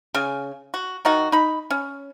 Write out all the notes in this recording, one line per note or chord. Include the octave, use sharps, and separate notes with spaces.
C#3 G#5
F#4
D#3 D#4 F#4
D#4 B5
C#4